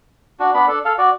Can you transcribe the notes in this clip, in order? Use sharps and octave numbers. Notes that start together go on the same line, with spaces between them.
D4 F#4
B3 D4 B5
D4 A4
A4 F5
F#4 D5